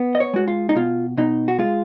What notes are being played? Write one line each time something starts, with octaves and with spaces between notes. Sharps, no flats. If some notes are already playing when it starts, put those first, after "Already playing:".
Already playing: B3
D#5
C#5
G#3 F#4
F4
D#4
B2 F4
B2 D#4
F#4
G#3 F4